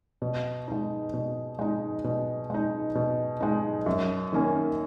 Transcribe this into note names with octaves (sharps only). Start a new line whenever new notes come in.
B2
G#3 D#4
B2
G#3 D#4
B2
G#3 D#4
B2
G#3 D#4
F#2
D#3 A#3 C#4